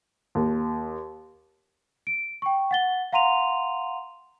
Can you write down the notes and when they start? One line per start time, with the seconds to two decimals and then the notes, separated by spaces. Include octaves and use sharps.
0.35 D#2
2.07 D7
2.42 G5 C#6
2.71 F#5 A6 G7
3.12 F5 F#5 A#5 C6 D#7 F7